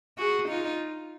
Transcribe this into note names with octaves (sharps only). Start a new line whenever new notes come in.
F#4 G#4
D#4 F4